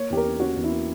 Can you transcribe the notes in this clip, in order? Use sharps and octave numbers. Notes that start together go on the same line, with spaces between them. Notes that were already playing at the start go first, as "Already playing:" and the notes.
Already playing: A#3 C#5
E2 G4
A#4
C#4
C#4 F#4
E2
E4
A#3